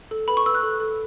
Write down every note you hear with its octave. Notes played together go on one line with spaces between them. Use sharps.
A4
B4 B5
C#6
B4 E6
F#6
A4
A4